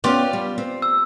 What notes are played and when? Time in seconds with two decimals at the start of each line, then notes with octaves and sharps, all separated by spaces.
0.04 B3 C#4 F4 G4 D5
0.33 G3
0.58 C4
0.82 E6